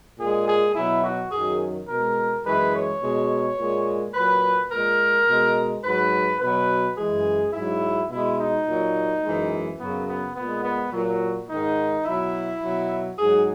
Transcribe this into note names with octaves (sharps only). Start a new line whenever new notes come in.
A#2 G#3 G#4
G#4
B2 F#3 E4
F#4
F#2 D#3 F#3 G#4
B2 G#3 A#4
F#2 E3 G#3 B4
C#5
B2 G#3
A#2 G#3
A#2 F#3 B4
A#2 G#3 A#4
B2 G#3
G#2 F#3 B4
B2 F#3 B4
F#2 E3 G#3 G#4
G#2 F#3 E4
B2 G#3 E4
D#4
A#2 F#3
F#2 E3 G#3
F#2 C#3 F#3 B3
B3
A#2 G#3 B3
B3
A#2 F#3
G#2 D#3 G#3 D#4
B2 F#3 E4
B2 F#3
G#2 F#3 G#4